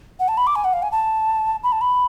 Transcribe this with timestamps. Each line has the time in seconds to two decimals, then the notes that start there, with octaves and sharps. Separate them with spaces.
0.20 F#5
0.28 A5
0.37 B5
0.47 D6
0.56 G#5
0.64 F#5
0.73 F5
0.83 G#5
0.92 A5
1.63 B5
1.72 A5
1.81 B5